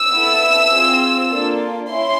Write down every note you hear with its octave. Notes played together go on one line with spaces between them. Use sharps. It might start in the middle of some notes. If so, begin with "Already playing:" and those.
Already playing: E6
B3 E4 A4
C4 F4 G#4
A#3 D4 F4 A4
C#4 E4 C6